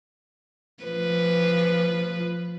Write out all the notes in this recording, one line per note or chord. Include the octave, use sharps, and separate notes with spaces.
F3 B4